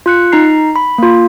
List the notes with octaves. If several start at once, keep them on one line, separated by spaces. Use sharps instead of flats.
F4 F#6 C#7
D#4 A#5 C7
B5
A#3 F4